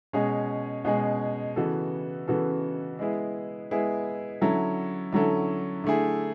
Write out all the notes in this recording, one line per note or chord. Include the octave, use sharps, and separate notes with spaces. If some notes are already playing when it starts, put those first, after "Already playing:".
B2 G#3 C#4 G#4
B2 G#3 C#4 G#4
C#3 E3 B3 F#4 A4
C#3 E3 B3 F#4 A4
G#3 B3 E4 G#4
G#3 B3 E4 G#4
D3 F#3 C#4 E4 A4
D3 F#3 C#4 E4 A4
D3 A3 E4 G#4